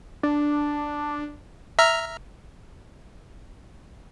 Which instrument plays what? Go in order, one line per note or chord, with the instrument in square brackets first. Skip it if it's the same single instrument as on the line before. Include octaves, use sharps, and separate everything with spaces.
[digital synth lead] D4
[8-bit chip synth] E5 A#5 F6